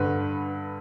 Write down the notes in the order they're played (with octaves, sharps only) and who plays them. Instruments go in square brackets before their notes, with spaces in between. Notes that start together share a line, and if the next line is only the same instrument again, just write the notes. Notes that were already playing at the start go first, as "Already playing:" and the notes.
Already playing: [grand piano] G2 D3 B4